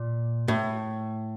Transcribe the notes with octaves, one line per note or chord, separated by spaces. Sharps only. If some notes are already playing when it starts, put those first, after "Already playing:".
Already playing: A#2
A2